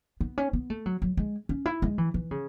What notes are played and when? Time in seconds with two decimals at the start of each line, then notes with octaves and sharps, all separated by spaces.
0.21 B3
0.38 C#4
0.53 B3
0.70 A3
0.86 F#3
1.02 F#3
1.17 G#3
1.49 C#4
1.66 E4
1.82 G#3
1.98 E3
2.14 E3
2.31 C#3